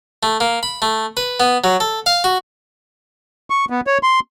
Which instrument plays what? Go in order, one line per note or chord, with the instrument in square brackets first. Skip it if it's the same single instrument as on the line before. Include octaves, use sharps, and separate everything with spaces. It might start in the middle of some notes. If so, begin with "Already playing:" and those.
[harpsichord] A3
A#3
B5
A3
B4
B3
F#3
A4
F5
F#4
[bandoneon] C#6
B3
C#5
C6